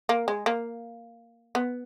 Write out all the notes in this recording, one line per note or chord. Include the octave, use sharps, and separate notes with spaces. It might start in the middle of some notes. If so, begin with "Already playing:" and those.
A#3
G#3
A#3
B3